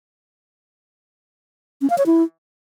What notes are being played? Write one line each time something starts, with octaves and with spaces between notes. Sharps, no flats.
C#4
F5
C#5
E4